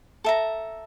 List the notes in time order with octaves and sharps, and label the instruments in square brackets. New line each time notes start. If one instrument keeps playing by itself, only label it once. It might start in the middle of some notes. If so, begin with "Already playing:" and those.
[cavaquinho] A4 E5 A#5